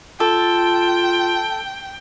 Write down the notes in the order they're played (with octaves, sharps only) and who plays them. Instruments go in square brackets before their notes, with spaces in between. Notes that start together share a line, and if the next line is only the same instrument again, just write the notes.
[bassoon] F4 [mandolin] A4 [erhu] G5